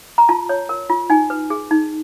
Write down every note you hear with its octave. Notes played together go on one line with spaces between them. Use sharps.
A#5
F4 A5
C#5
A#4
F4
D#4 G#5
B4
G#4
D#4